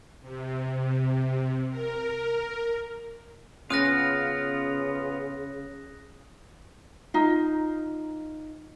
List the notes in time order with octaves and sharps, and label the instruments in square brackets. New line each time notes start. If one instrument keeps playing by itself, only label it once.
[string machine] C3
A#4
[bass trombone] C#3 [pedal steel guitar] B3 F4 [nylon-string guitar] C#4 [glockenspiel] D#6 F#6 A#6
[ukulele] D#4 F4